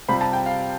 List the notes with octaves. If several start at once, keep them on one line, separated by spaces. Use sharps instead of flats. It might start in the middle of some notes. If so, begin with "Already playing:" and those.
C3 G3 C4 F4 B5
A5
G5
F5